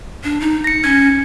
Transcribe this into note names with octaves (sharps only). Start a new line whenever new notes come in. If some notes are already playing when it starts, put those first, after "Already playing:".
D4
D#4
A#6 C#7
C#4 G#6